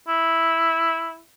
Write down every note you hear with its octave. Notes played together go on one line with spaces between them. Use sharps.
E4